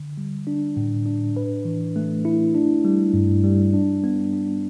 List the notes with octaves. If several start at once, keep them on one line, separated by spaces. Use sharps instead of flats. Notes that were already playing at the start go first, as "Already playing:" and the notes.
Already playing: D3
G3
D4
A2
D4
B4
E3
A3
E4
D4
G3
G2
G3
D4
B3
D4